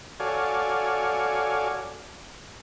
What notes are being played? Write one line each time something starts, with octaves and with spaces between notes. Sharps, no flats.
F#4 A4 C#5 D5 F5 G#5